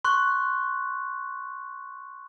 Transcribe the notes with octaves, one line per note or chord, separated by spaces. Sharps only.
C6 C#6 F#6